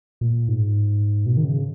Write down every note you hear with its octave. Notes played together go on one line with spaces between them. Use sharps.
A#2
G#2
B2
D#3
C#3